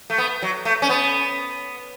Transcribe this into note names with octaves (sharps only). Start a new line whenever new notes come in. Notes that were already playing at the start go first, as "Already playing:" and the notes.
A3
B3
F#3
A3
C#4
B3